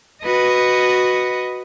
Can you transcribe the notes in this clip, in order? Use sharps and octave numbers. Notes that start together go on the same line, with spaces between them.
F#4 B4 D#5